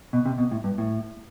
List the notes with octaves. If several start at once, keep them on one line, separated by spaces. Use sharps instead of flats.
B2
C3
B2
A2
G2
A2